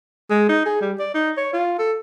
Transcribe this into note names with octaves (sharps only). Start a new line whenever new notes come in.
G#3
D#4
G#4
G3
D5
D#4
C#5
F4
A4